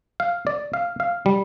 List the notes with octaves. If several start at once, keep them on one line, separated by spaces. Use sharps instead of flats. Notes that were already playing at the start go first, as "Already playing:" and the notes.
F5
D5
F5
F5
G3